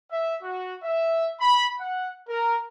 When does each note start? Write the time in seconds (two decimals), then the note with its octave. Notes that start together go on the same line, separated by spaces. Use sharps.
0.11 E5
0.43 F#4
0.84 E5
1.41 B5
1.80 F#5
2.29 A#4